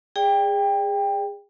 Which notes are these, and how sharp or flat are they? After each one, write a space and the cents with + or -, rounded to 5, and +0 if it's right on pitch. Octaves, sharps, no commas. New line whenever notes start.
G#4 -25 D5 +0 G5 +15